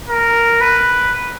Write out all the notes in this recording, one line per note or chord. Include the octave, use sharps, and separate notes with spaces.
A#4
B4